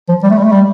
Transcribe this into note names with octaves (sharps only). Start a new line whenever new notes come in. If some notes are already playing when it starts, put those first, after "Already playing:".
F3
G3
A3
G3
A3
G3